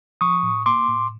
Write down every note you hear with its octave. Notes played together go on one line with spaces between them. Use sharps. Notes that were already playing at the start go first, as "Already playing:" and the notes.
F3 C#6 D#6
A2
A#3 C6 D6
A2